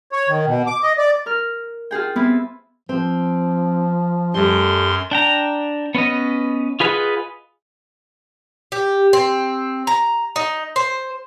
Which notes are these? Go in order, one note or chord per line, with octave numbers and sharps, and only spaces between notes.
C#5
D#3
B2
D6
D#5
D5
A#4 F6
F4 F#4 G#4 G5
B3 C4 E4 F4 B4 C5
F3 C4
F#2 G3 A3 C6
D4 G5 A#5
B3 C#4 B4 D#5
F4 G#4 B4 D#5 F#5
G4
C4
A#5
D#4
C5